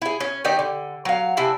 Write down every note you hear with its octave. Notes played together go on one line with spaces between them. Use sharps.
E4 G#4
C#4
D#3 D#4 G4 D5
D3
F#3 F5
C3 D4 E4 G#5